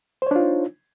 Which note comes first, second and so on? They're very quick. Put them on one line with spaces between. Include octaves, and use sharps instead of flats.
C5 C#5 D4 F4 D#4